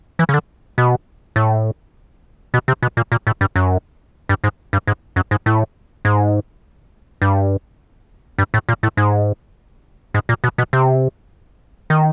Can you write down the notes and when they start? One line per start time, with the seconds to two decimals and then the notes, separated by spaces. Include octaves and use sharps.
0.19 E3
0.29 C#3
0.34 D3
0.78 B2
1.36 A2
2.54 B2
2.68 C3
2.83 B2
2.97 A#2
3.12 A#2
3.27 A2
3.41 G2
3.56 F#2
4.29 G2
4.44 G#2
4.73 G2
4.87 G#2
5.16 F#2
5.31 G#2
5.46 A2
6.05 G#2
7.22 G2
8.38 G2
8.54 A2
8.69 A#2
8.83 A2
8.97 G#2
10.14 G#2
10.29 A#2
10.44 B2
10.58 B2
10.73 C3
11.90 D#3